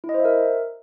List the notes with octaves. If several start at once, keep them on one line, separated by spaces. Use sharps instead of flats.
E4
D#5
C5
E5
A#4